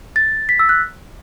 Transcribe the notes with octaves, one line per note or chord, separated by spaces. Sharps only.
A6
B6
E6
F#6